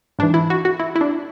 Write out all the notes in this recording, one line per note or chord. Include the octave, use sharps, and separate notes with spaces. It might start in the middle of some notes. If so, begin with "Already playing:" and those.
G#2 E3 D4
E4
F#4
F#4
E4
E4
D4